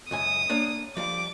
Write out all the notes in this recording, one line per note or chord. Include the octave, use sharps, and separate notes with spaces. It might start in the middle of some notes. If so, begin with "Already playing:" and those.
C#2 F#2 G#5 D#6
A#3 D4 C#5
F3 G3 F5 D6